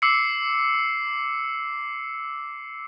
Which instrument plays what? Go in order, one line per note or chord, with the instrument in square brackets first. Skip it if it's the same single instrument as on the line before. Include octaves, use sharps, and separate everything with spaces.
[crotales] D6 E6 C7 C#7